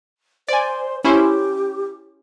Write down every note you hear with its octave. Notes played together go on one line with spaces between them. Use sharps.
C5 D5 G#5
C#4 E4 G4 C5